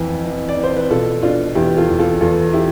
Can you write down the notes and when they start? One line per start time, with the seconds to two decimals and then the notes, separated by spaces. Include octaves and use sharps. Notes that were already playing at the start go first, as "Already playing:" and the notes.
Already playing: F2 E3
0.25 E3
0.49 D5
0.57 E3
0.63 C5
0.76 B4
0.90 B2 F4 A4
1.22 B2 D4 F4
1.55 E2 E4 G4
1.77 F4 A4
1.89 E2
1.99 F4 A4
2.21 E2 F4 A4
2.53 E4 G4